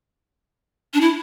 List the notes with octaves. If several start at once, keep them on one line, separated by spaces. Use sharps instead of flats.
D4
E4